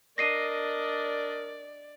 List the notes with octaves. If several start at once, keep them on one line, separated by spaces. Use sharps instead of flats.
D4 A#4 D5 D#5 A#6 C7 D#7